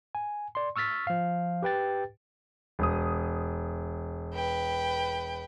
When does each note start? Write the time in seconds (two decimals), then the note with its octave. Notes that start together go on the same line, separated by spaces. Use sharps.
0.15 G#5
0.55 D5 C6
0.76 C#6 E6 F6 A6 B6
1.07 F3 F5
1.63 G4 B4 G5 A6
2.79 E1 D#6
4.34 B4 G5